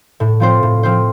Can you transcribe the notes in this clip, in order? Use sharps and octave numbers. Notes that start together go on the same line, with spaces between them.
A2
F3 C4 F4 C5
A2
F3 C4 F4 C5